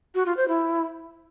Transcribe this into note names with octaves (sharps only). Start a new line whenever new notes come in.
F#4
F4
C5
E4